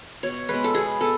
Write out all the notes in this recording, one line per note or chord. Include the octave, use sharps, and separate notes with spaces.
B2 C#5
G#3 B4
B3
A4
B2 G#4
B3 A4